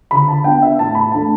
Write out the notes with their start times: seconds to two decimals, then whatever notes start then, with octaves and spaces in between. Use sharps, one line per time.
0.11 D3 B5
0.28 A5
0.44 B3 D4 G5
0.62 E5
0.78 A2 A5
0.95 B5
1.12 A3 D4 A5